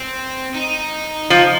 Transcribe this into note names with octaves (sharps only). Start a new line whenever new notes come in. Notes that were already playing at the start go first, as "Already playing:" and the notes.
Already playing: C4
D#4
F3